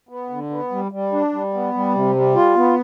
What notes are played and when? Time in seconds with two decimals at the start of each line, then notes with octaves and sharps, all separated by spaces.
0.09 B3
0.30 D3
0.50 B3
0.71 G3
0.92 G3
1.12 D4
1.32 G3
1.54 B3
1.74 G3
1.94 C3
2.15 G3
2.35 F4
2.56 B3